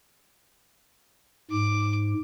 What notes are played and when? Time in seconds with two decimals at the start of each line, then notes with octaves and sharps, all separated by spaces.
1.51 G#2 D6